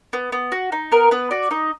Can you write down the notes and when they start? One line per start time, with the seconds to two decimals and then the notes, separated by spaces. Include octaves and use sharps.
0.13 B3
0.32 B3
0.52 F#4
0.72 D#4
0.92 B3 A#4
1.11 B3 B4
1.31 F#4 D5
1.51 D#4 D#5